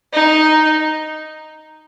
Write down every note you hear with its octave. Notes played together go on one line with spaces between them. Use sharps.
D#4